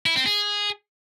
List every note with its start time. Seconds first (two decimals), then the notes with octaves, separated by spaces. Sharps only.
0.06 E4
0.16 C4
0.26 G#4